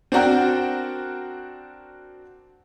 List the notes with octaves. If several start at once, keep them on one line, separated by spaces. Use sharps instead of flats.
C4 D4 F#4 A#4 G5